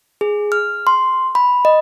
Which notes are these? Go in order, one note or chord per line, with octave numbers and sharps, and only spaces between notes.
G#4
F6
C6
B5
D#5